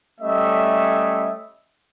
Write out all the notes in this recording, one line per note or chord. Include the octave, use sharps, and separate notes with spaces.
G3 A3 C#4 D#5 E5